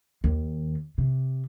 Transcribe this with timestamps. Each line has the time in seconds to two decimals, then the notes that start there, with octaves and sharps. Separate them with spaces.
0.24 D#2
0.98 C3